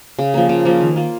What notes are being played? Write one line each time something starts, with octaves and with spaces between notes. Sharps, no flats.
C#3
F3 A#3
C#3
F3 A#3
D#3
A#3 F4